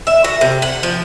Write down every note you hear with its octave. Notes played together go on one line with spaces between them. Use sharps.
E5
F#4
C3
F#5
F3